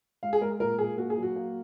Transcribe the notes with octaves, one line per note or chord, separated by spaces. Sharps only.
G#3 F5
G#4
G#3 A#4
A#2 A#4
A#2 G#4
A#3 F#4
G#4
F#3
F#4
A#3